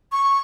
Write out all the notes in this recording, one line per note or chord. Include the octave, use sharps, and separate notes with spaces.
C#6